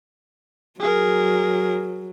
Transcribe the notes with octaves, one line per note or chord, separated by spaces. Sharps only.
F#3 G#4 A#4